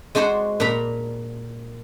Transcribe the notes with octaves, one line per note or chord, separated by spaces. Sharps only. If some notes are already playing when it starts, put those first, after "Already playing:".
G#3 D4 F#4 C5 F#5
A#2 D4 A#5 B5